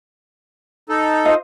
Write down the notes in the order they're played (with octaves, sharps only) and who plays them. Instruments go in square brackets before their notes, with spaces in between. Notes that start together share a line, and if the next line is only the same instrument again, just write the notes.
[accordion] D#4 A4
[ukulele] F4 C5 D#5